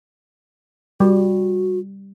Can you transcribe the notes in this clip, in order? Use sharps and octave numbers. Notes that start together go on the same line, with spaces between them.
G3 F#4